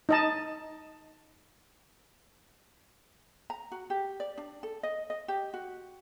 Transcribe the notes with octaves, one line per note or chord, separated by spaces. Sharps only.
D#4 D#5 A5
A#5
F#4
G4
D5
D4
A4
D#5
D#5
G4
F#4